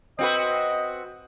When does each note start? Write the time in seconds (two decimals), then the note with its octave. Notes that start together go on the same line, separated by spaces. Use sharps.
0.19 C4 F#4 B4 D#5